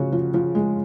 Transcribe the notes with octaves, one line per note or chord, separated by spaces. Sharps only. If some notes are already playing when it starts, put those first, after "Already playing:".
Already playing: C#3 F3 F#4
F3
F3
G#3